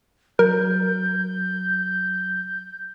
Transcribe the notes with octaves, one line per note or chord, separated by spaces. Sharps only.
F#3 A#4 G6